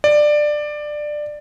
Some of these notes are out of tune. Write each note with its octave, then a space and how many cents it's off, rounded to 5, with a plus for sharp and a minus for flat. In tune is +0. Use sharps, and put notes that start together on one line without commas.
D5 +15